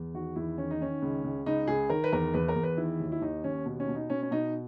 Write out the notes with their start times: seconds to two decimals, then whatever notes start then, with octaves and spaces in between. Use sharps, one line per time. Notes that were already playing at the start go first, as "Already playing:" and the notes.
Already playing: E2
0.14 D#3 F#4
0.36 E2 E4
0.58 D#3 C#4
0.71 D#4
0.81 D#3 C#4
1.02 C#2
1.24 C#2
1.46 C#2 D#4
1.68 C#2 G#4
1.90 D#3 A#4
2.04 B4
2.12 E2 A#4
2.34 E2 B4
2.48 A#4
2.56 E2
2.63 B4
2.77 D#3 E4
3.00 D#2
3.12 E4
3.22 D#2 D#4
3.44 D#2 C#4
3.66 B2
3.80 C#4
3.88 B2
3.95 D#4
4.10 B2 C#4
4.23 C#4
4.31 B2 D#4